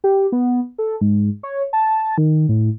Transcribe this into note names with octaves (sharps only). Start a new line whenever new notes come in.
G4
B3
A4
G#2
C#5
A5
D#3
A2